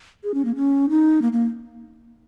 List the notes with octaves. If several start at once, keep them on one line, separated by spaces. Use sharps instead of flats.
G#4
C#4
A#3
C#4
D#4
A#3
A#3